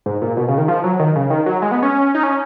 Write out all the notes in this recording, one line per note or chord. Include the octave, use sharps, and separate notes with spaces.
G#2
A#2
B2
C#3
D#3
F3
F#3
D#3
C#3
D#3
F#3
G#3
B3
C#4
D#4
C#4